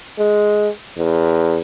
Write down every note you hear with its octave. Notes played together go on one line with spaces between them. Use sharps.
G#3
E2